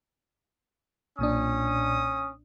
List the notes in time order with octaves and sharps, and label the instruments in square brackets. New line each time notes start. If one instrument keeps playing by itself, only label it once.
[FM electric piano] B1 A#2 D4 [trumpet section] C#4 D#6